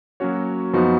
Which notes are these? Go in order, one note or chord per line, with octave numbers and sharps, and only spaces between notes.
F#3 A#3 C#4 F#4 C#5
F#2 F3 B3 D#4 F#4